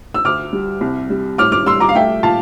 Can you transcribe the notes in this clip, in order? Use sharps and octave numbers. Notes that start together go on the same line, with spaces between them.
E6
D2 D6 F6
G3
C2
G3
A2 D6 F6
D6 F6
G3 C6 E6
A#5 D6
F5
A3 E5 G5
A#2 F5 A5